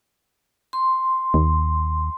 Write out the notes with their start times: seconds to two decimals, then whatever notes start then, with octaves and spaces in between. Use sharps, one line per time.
0.73 C6
1.34 D#2